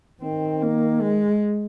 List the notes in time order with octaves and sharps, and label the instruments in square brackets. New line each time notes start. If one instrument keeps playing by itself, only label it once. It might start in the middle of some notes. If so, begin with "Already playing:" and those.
[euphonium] D#3 [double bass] C4
[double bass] A#3
G#3